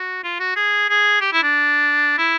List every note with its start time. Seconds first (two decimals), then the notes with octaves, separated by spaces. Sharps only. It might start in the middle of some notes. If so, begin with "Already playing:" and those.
Already playing: F#4
0.24 F4
0.40 F#4
0.56 G#4
0.89 G#4
1.21 G4
1.33 E4
1.43 D4
2.18 E4